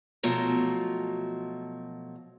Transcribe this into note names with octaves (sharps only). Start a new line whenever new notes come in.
B2 F3 F#3 A3